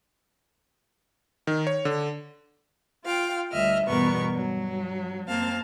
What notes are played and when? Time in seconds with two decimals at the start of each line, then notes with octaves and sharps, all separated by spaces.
1.47 D#3
1.67 C#5
1.85 D3
3.03 F4 F5 G5
3.51 D2 G3 D#5 E5 F6
3.86 E2 G2 B2 B3 A#4 C#6
4.31 G2 F#3
5.28 F#2 A#3 C4 F5 A5